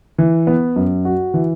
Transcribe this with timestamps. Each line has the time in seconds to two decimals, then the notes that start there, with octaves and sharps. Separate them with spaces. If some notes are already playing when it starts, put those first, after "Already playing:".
0.18 E3
0.47 B3
0.76 F#2
1.05 F#4
1.34 E3